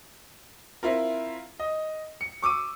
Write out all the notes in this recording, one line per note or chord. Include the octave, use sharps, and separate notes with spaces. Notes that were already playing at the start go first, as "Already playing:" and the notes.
C4 E4 F4 A#4
D#5
C#7
C#6 D6 E6 D#7